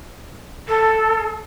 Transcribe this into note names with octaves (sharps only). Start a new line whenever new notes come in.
A4